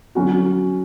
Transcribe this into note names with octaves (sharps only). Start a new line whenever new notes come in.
D3 F#3 C#4 F#4